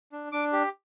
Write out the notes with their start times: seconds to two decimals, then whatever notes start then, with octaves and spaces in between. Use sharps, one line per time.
0.12 D4
0.32 D4 D6
0.53 G4